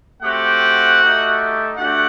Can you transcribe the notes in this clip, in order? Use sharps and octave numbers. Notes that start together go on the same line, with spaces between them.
A3 C4 F#4 G4 F#5
A3 D#4 G4
A3 D4 F#4 G4 F#5